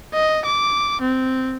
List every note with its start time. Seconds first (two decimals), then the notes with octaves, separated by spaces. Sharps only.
0.14 D#5
0.45 D6
1.01 C4